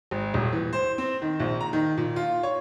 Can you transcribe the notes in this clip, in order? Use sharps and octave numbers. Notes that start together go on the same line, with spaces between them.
G#1
D#1
E3
C5
C4
D#3
A#1
A#5
D#3
A#2
F4
C#5